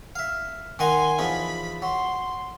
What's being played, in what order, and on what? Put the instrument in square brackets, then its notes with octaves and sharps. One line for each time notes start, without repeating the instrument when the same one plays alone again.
[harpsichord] E5 F5
[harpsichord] D#3 F#5 A#5 [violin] G#5 C6
[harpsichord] E2 F3 D#4 [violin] B5
[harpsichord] F#3 [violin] C6